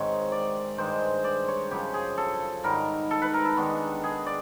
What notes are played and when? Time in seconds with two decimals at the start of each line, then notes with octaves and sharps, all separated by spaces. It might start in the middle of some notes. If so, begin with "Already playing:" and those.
Already playing: G#2 D#3 G#3 C4 C#5
0.32 D5
0.78 G2 D#3 G#3 C5
1.24 D5
1.48 C#5
1.71 F#2 C#3 F3 G4
1.93 G#4
2.18 A4
2.63 G#2 D#3 G3 A#4
3.11 A4
3.22 B4
3.34 A#4
3.45 A4
3.57 D#3 G#3 B3 D4
4.04 G#4
4.26 D5